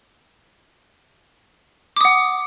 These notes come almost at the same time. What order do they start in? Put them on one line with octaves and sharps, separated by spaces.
D6 D#6 F#5